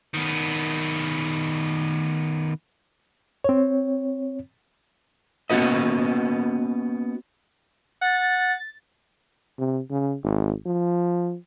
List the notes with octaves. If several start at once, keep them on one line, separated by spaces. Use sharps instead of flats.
D#3 B3
C4 C#5
A#3 B3 C#4 F#4 B4 D#5
F#5 A6
C3
C#3
G#1
F3